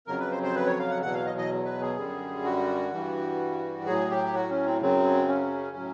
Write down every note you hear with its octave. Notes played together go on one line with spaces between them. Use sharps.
F2 C#3 F#3 A#4
B4
C5
C5
B4
C#5
F5
F#5
E2 B2 F#3 F#5
F5
D#5
D#5
B4
G#4
F#2 D3 G3
F#4
G2 E3 G3
A2 F#3 G#4
G4
F#4
C#4
C4
F#2 C#3 F#3 C4
C#4
A2 F#3